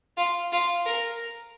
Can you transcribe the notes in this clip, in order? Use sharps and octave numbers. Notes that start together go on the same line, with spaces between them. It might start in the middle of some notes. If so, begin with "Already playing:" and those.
F4
F4
A#4